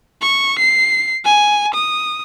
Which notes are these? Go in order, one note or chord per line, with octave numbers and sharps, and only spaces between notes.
C#6
C7
G#5
D#6